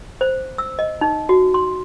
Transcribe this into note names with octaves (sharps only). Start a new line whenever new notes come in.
C5
E6
D#5
D#4
F#4
C6